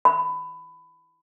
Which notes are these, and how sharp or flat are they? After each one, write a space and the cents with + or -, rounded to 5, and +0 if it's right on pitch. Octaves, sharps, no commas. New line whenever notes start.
B5 +20